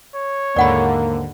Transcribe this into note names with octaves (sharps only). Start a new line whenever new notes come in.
C#5
D#2 G#2 D3 A#3 D5 F#5 B5